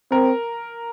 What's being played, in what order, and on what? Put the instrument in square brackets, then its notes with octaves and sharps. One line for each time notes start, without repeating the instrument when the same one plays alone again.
[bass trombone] C4 [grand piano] A#4